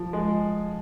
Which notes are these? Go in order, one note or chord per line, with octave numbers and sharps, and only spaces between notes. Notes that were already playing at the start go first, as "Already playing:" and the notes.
Already playing: F3
G#3